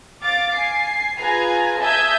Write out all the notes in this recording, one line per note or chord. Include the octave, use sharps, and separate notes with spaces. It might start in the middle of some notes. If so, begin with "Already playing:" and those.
F5 D6 A6
G#5 C7
F4 G#4 B4 G#5 A#5
E5 A5 D#6 G6 G#6